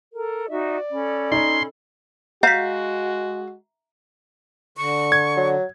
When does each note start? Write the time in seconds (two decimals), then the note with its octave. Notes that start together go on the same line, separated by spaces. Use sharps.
0.13 A4 A#4
0.50 D#4 F#4 D5 E5
0.91 C#4 A4 B5
1.32 D#4 D#5 C6
2.43 G#3 F#4 E5 F5 A#5 G6 B6
4.77 D3 C#6
5.12 G#6
5.36 F#3